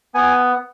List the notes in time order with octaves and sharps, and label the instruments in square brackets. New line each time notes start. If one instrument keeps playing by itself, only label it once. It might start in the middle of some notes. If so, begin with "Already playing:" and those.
[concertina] B3 G#5